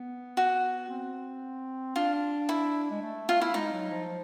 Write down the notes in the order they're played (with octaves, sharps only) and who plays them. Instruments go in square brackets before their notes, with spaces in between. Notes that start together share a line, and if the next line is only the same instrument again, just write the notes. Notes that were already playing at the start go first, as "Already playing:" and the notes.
Already playing: [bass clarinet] B3
[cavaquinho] F#4
[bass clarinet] C4
[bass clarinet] D4 [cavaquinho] F4
[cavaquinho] E4
[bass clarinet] G#3
A3
[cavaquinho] F4
E4
[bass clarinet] G#3 [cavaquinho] D#4
[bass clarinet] F#3
F3